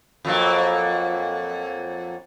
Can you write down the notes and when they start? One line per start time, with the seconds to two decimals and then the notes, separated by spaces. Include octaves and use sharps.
0.25 F2 F#3 A#3